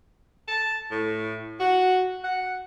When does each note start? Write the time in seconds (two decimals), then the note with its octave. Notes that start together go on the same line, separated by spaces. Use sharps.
0.49 A5
0.92 A2
1.60 F#4
2.23 F#5